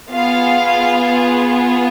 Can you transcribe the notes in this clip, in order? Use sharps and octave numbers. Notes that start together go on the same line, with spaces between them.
B3 F4 G#4 F5